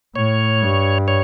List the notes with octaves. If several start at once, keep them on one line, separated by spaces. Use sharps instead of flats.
A2 C#5
G2
C#5